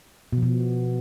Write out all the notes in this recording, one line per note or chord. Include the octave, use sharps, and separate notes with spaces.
B2
F3
B2